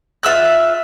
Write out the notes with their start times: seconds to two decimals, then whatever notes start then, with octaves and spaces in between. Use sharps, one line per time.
0.23 F4 E5 E6 F#6